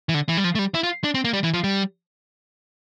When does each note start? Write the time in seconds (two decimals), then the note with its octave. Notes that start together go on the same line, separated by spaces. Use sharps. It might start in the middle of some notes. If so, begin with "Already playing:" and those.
0.09 E3
0.14 D3
0.29 E3
0.37 G3
0.44 F3
0.55 A3
0.59 G3
0.75 E4
0.83 F4
1.04 D4
1.14 C4
1.25 A#3
1.33 G3
1.44 E3
1.54 F3
1.64 G3